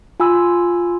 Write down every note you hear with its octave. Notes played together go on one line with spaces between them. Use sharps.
F4 G#5 B5 E6